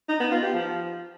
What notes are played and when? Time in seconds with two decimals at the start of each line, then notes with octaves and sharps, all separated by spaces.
0.09 D#4
0.20 B3
0.31 F4
0.42 G4
0.53 F3